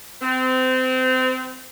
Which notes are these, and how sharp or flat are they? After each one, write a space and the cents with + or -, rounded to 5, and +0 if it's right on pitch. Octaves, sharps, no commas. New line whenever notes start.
C4 -25